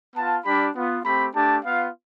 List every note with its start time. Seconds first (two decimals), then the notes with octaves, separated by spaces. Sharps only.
0.16 B3 F4 A5
0.45 G3 D4 G4 B5
0.75 B3 F4
1.05 A3 C4 G4 B5
1.35 A3 D4 G4 A5
1.65 B3 F4 F5